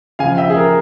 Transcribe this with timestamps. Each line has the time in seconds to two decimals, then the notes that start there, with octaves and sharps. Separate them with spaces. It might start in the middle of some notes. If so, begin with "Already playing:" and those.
0.19 C#3 F5 G#5
0.23 F3
0.37 E5 G5
0.50 G#4
0.56 A#4